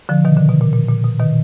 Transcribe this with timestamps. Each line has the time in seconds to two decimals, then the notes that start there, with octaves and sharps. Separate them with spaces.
0.09 D3 F3
0.25 B2 D#3
0.36 A#2 D3
0.49 B2
0.61 A#2
0.73 A#2
0.89 A#2
1.04 B2
1.20 B2 D#3